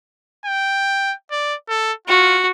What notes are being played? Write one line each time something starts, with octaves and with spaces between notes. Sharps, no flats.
G5
D5
A4
F4 F#4